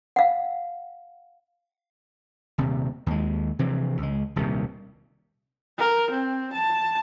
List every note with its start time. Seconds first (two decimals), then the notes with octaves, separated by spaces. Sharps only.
0.16 F5 F#5
2.58 D#1 C3
3.06 D#2 G#3
3.59 C3 E3 F3
3.98 C#2 G#3
4.36 D#1 C2 C3 D#3
5.78 A#4
6.10 C4
6.53 A5